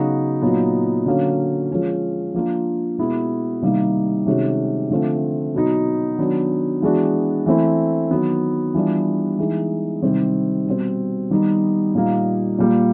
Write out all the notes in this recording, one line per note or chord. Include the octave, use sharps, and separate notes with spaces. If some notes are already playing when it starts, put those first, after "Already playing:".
Already playing: C#3 F#3 B3 D#4 F#4
A#2 F#3 B3 D#4
D3 F#3 A#3 C#4
F3 G#3 C#4 F4
F3 A#3 D4 F4
B2 G#3 B3 E4
C3 D#3 G3 A#3 D#4
C3 D#3 G#3 C#4 F#4
D3 F3 A3 C4 F4
B2 F#3 B3 D#4
D#3 F#3 B3 D4
E3 G#3 B3 D4 F#4
E3 A3 C4 E4
D#3 F#3 B3
E3 G3 B3 D4 F4
E3 G#3 B3 D#4
C3 D#3 G3 C4
B2 G3 C4
D#3 G3 B3 D#4
A#2 G3 A#3 D#4
A#2 G3 A#3